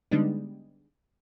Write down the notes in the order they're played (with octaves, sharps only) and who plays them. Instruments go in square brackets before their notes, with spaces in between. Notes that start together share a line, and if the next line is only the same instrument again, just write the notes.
[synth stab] D3 G3 G#3 B3 D4 D#4